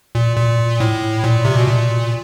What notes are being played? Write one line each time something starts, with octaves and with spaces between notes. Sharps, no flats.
A#2
A#2
A2
A#2
C3
B2
A#2